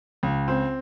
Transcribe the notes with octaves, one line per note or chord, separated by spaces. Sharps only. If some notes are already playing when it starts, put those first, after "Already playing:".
C#2
C4